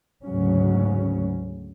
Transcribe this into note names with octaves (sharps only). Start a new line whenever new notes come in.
D2 G#2 C#3 F#3 C#4